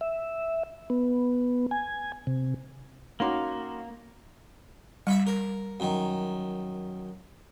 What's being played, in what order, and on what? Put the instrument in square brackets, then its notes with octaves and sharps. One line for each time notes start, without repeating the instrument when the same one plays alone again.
[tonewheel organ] E5
B3
G#5
C3
[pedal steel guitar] A#3 [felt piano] C#4 D#4 F#4 [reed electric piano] F5 C6 D6
[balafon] G3 [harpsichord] E5 B5 C#6
[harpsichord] A#4
F#2 D#3